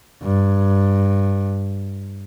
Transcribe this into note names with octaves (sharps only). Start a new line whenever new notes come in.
G2